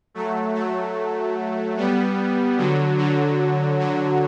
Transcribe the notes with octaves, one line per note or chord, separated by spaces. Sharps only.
F#3 A3
F#3 A3
G3 B3
D3 F#3
D3 F#3
D3 F#3